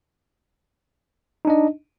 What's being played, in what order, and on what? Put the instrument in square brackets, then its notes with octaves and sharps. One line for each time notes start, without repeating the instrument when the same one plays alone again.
[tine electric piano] D#4
D4
D#5